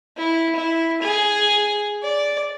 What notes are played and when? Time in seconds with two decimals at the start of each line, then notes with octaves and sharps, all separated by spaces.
0.17 E4
0.55 E4
1.02 G#4
2.03 D5